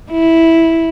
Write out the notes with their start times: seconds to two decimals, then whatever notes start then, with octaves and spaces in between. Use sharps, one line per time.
0.12 E4